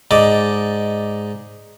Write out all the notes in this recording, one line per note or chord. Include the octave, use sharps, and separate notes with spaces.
G#2 D5 D#5 A5